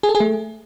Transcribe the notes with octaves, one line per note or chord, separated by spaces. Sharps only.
G#4
A4
G#4
A3